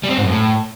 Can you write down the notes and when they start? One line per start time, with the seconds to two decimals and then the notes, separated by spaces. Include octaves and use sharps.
0.03 G3
0.10 C4
0.17 G#2
0.24 F#2
0.30 A2